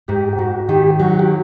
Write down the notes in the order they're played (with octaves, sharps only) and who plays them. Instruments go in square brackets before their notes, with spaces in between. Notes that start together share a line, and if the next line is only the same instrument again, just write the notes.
[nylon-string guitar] G#2 [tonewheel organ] G4
[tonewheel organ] G4
[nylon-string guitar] G#2 [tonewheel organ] F#4
[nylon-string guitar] D#3 [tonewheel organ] G4
[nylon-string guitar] F#3 [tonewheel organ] F#4
[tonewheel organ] G4